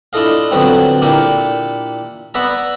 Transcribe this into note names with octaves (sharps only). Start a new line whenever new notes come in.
D4 E4 F4 A4 D#5 F5
D3 F3 F#3 B3 C4
A#2 A#3 D4 E4 G4
B3 B4 D5 E5 A#5